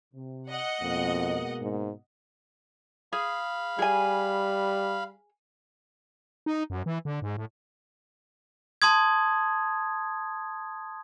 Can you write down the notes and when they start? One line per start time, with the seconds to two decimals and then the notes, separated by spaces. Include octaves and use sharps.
0.14 C3
0.50 D#5 F#5
0.81 F2 B2 G#3 A#3
1.61 G#2
3.13 G#4 F5 B5
3.79 G3 G#4 G#5
6.46 D#4
6.70 F#2
6.86 E3
7.05 D3
7.22 G#2
7.37 A2
8.82 A5 C6 D#6 G#6